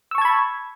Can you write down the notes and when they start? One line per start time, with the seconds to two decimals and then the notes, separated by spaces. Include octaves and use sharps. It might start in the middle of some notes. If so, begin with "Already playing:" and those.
0.11 E6
0.15 C#6
0.18 A5
0.22 G#6
0.25 B5